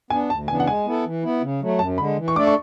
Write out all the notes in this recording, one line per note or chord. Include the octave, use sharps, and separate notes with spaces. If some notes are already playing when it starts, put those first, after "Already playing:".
B3 D4 G#5
D2 A5
C#3 E3 B3 D4 G#5
F#5
G#3 G#5
B3 E4 A4
E3
B3 E4
C#3
F#3 A3
F#2 A5
D3 G#3 B5
E3
C#6
A3 D4 A4 D5 D6
C#6